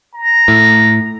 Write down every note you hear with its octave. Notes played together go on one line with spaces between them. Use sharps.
A#5
A2